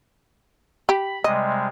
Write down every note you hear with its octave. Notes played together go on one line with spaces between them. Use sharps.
G4 B5
C3 G3 G#3 D#5